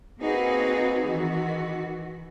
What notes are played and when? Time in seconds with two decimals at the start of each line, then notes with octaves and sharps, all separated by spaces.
0.19 A#3 C4 D#4 F#4 G#4 B4
1.03 D#3 E3 F#4